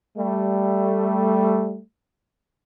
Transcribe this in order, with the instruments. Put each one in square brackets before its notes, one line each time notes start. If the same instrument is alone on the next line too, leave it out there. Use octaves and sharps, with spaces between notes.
[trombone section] G3 A3